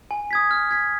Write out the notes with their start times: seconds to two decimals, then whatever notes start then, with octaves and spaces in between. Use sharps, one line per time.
0.11 G#5
0.31 D#6 G#6 B6
0.51 F6
0.71 G#6 B6